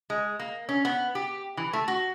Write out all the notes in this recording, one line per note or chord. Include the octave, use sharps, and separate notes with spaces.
G#3
A#3
C#4
B3
G4
E3
A3
F#4